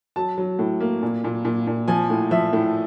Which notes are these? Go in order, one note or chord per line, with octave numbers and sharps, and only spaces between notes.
F#3 A5
F#3
A2
A#3
A#2
A#2
A#2
A#2
F3 G#5
A2
F3 E5
A2